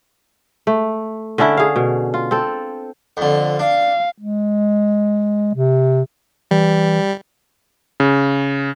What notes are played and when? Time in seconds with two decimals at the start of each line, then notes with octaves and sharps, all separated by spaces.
0.67 A3
1.38 D3 C#4 D4 E4
1.57 G#4 F5
1.76 B2
2.14 F4
2.31 C4 A4
3.17 F2 D3
3.59 D4 F5
4.19 G#3
5.54 C3
6.51 E3 G3
8.00 C#3